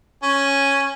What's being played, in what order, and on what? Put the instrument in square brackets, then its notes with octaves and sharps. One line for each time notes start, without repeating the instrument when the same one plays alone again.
[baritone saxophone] C#4